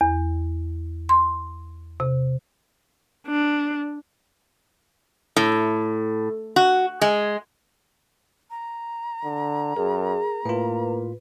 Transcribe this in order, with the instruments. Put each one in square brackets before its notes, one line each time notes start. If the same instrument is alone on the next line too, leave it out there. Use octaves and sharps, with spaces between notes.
[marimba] E2
C6
C3
[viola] D4
[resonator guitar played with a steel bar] A2
F#4
G#3
[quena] A#5
[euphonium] D3
[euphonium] F#2 [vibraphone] G#4 [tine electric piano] A#4
[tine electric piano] A2 F4 [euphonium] A#3 [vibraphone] B4